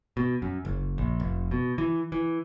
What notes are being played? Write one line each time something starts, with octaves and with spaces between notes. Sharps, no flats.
B2
F#2
F#1
A#1
F1
B2
E3
E3